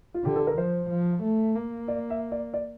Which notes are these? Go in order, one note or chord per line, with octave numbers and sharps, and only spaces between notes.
F4
D3 G4
A4
A#4
F3 C5
F3
A3
A#3
D5
E5
D5
D5